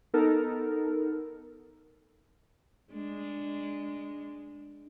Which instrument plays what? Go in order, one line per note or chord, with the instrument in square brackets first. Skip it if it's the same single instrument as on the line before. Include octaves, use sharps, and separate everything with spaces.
[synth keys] B3 D#4 A4 A#4
[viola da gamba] G#3 D4